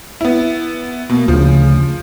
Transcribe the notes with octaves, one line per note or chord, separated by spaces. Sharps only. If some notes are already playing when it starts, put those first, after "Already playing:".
B3 E4
B2 A#3
D2 C#3 F3